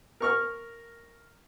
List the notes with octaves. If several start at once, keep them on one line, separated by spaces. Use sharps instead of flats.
A#4 C#6 F6